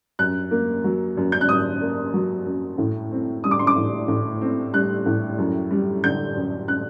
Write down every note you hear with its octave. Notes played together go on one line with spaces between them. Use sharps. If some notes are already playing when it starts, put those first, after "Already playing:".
F#2 F#6
A#3
F#3
F#2
G6
F#6
F#2 D#6
A#3
F#3
F#2
A2
C4
G3 D#6
D6
C6
D6
A2
A2
C4
G3 F#6
A2
F#2
G3
D3 G6
F#2
F#6